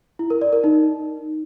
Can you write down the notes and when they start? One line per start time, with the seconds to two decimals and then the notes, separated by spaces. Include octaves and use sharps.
0.19 E4
0.30 A#4
0.41 D5
0.53 A#4
0.64 D#4